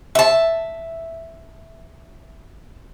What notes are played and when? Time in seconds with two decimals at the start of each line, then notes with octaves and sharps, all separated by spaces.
0.15 E5 A5